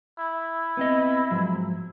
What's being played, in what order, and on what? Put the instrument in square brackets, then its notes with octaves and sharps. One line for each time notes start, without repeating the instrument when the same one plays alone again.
[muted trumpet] E4
[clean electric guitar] B3 C4 D#5
G#2 F3 F#3